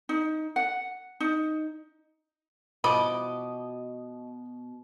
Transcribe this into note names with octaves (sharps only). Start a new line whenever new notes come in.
D#4
F#5
D#4
B2 E3 F3 D#5 B5 D6